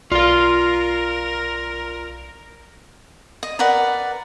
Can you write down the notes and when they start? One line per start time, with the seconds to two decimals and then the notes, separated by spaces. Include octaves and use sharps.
0.12 B1 F4 A#4 D5 F5 C6
3.43 D#5
3.59 A#4 B4 D5 F#5